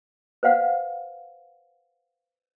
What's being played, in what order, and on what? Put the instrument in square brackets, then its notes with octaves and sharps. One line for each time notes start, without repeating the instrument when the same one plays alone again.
[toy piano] B4 C5 F5 F#5